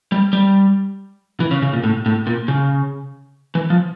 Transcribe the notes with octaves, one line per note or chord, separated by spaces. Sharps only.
G3
G3
E3
C#3
C#3
A#2
A2
A2
A#2
C#3
E3
F3